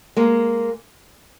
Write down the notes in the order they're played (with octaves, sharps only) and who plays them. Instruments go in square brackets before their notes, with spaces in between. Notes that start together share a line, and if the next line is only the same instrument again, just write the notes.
[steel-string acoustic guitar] G#3 A#3